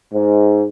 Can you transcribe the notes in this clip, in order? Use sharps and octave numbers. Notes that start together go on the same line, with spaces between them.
G#2